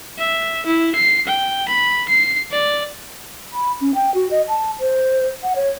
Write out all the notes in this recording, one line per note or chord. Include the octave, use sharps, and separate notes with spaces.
E5
E4
C7
G5
B5
C7
D5
B5
C#4
G5
F#4
D#5
A5
C5
F#5
C#5